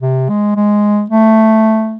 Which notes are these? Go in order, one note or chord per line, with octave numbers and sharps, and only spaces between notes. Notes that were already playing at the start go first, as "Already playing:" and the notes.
C3
G#3
G#3
A3